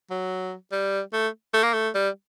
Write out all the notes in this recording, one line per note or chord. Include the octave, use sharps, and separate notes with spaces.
F#3
G3
A3
A3
A#3
A3
G3